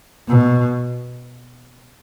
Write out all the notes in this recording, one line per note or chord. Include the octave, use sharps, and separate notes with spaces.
B2